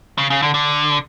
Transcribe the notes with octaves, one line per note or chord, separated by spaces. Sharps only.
C#3
C#3
D3
D3